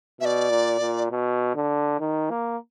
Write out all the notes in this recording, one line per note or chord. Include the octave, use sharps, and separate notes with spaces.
B2 D5 E5
A#2
A#2
B2
D3
D#3
A#3